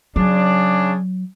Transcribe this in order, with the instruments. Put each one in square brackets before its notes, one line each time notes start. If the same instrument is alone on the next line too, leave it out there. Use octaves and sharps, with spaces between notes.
[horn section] C#3 D4 [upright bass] F#3